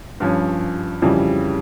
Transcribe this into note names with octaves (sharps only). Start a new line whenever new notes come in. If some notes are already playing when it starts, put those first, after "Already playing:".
G2 F3 C#4
F2 C#3 E3 G3